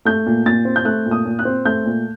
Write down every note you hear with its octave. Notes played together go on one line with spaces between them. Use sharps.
A3 G6
A#2
A#2 A6
C4
G6
A3 F#6
A#2
D#6
A#2
F#6
C4
A3 G6
A#2